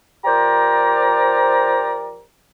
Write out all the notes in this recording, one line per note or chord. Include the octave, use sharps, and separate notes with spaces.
F3 G4 A#4 C5 D5 A#5